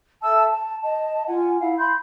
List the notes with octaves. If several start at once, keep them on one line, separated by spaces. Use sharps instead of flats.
A4 E5 A5 E6
A5
D#5 A5
F4 F#5 G#5
E4 F5 F#5
B5 C6 G6